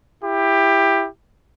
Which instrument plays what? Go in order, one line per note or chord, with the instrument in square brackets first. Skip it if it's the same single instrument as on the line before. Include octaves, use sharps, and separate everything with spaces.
[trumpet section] E4 G4